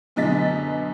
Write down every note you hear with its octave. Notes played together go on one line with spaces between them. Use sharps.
F#2 B2 D3 D#5 A6 B6